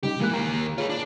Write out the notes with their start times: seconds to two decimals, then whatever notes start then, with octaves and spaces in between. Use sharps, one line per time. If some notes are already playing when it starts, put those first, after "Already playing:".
0.03 C#3 G3 D#4 G4
0.20 E3 G#3 A#3 F#6
0.33 D#3 A#3 A#5
0.78 F4 G#4 B4 C#5
0.89 D4